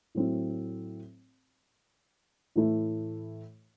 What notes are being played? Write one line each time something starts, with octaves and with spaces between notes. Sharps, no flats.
A2 F#3 C4 E4
A2 E3 A3 E4